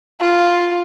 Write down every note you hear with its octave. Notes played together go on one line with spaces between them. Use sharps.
F4